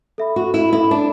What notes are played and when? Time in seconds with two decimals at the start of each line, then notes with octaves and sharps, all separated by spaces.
0.18 A4 E5 B5
0.36 F#4
0.54 E4
0.73 E4 A4 E5 B5
0.91 D4